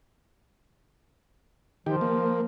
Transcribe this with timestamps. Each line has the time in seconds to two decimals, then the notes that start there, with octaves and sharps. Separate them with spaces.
1.86 D#3 F3 G4
2.01 A#3